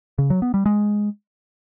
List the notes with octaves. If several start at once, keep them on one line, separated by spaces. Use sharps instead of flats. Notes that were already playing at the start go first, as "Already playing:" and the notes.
C#3
F#3
B3
G3
G#3